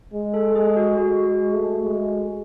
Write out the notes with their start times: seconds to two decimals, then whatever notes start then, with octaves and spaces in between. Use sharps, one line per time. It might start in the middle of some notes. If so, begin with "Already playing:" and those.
0.14 G#3
0.34 A4
0.55 G#3 G#4
0.76 F#4
0.98 G#3 F#4
1.27 G#3
1.55 A3
1.84 G#3